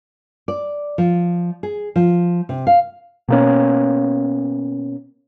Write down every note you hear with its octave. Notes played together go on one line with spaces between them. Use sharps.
D5
F3
G#4
F3
C3
F5
B2 A#3 C#4